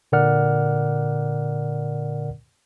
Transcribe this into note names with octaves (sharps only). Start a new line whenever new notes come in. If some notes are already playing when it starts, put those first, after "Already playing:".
A#2 D3 A#4 D5 F#5 F6